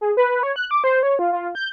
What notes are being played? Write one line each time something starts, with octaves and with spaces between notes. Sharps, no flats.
G#4
B4
C#5
F#6
D6
C5
C#5
F4
F4
G6